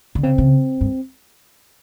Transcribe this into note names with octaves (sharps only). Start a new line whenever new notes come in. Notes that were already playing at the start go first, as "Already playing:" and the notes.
D3
C#3 C4
C#3
G2